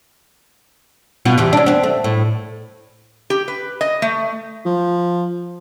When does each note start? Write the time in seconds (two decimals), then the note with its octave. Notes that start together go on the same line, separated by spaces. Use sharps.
1.25 B2 B3 F4
1.38 E2 C3 E3
1.53 C#4 D4
1.66 B3 C4
1.83 A3
2.04 A2
3.30 G4
3.48 B4
3.81 D#5
4.02 A3
4.65 F3